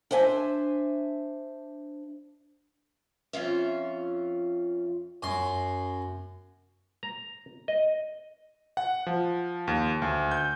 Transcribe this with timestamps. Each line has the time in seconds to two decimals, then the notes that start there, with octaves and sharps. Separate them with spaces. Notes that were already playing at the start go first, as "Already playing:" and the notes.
0.11 D4 C5 E5 G#5
3.33 F2 C#4 F4 E5
5.23 F#2 C6
7.03 A#5
7.68 D#5
8.77 F#5
9.07 F3
9.68 D#2
10.02 D2
10.31 G6